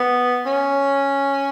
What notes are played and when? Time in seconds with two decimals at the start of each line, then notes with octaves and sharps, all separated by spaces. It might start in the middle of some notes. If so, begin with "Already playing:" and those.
Already playing: B3
0.46 C#4